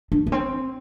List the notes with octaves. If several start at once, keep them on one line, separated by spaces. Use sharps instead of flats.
D4
A3
C4